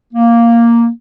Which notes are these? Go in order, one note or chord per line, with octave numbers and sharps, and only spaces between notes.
A#3